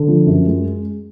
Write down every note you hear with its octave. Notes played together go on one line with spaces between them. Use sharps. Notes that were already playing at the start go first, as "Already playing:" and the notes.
Already playing: D3
F3
F#2
G#3